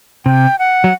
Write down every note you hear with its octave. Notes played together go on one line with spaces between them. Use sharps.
C3 G5
F#5
F#3